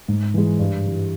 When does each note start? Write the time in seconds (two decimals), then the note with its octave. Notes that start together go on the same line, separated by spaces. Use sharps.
0.08 G#2
0.34 E3 G#3
0.59 G2
0.85 E3 G3